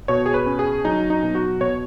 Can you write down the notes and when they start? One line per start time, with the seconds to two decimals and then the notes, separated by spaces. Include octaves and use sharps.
0.08 B2 C#5
0.26 G#4
0.34 B4
0.46 C#4
0.59 G#4
0.85 F#3 D#4
1.10 D#4
1.23 B2
1.35 F#4
1.61 B2 C#5